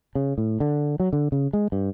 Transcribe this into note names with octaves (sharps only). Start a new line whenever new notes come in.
C#3
A2
D3
F#3
D3
C#3
G#3
G2